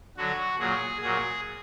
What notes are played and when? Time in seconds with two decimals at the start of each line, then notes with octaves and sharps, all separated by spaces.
0.17 D3 F#3 F#4
0.59 A#2 F#3 G#4
1.02 A#2 F#3 G#4